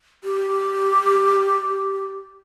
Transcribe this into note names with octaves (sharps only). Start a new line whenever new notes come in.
G4